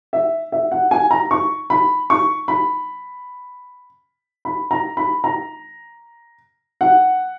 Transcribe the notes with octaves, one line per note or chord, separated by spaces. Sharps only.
E5
E5
F#5
G#5
A#5
C#6
B5
C#6
B5
B5
A#5
B5
A#5
F#5